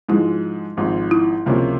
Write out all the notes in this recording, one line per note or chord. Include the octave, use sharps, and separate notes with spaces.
G#2 F3 G#3 E4
G#1 G#2 F3
E4
C#2 C3 F3 A#3 C#4